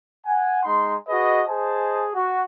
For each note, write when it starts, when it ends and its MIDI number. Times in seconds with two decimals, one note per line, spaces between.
0.26 0.63 78
0.26 0.63 80
0.64 0.94 56
0.64 0.94 63
0.64 0.94 84
1.08 1.41 66
1.08 1.41 68
1.08 1.41 71
1.08 1.41 75
1.48 2.07 68
1.48 2.07 72
1.48 2.07 75
1.48 2.07 80
1.48 2.07 81
2.14 2.42 66